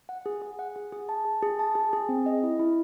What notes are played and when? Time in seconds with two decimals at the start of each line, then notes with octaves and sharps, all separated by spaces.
0.09 F#5
0.26 G#4
0.42 G#4
0.59 F#5
0.76 G#4
0.93 G#4
1.09 A5
1.25 G#4
1.43 G#4
1.59 A5
1.75 G#4
1.93 G#4
2.09 C4
2.26 D#5
2.43 E4
2.59 E4